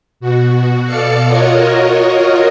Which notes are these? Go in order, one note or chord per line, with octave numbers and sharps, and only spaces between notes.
B2 F#4
B2 A4 D5 F5 C#7
F4 F#4 A#4 C#5 D#5